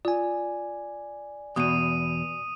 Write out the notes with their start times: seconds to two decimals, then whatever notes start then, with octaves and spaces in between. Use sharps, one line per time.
0.05 F4 D5 G#5
1.56 E2 B2 D#6 D#7